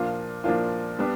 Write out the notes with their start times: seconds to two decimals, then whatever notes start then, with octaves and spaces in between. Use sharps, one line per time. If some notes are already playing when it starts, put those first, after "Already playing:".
Already playing: A#2 F3 A#3 D4 F4
0.44 A#2 F3 A#3 D4 F4
0.99 G3 B3 D4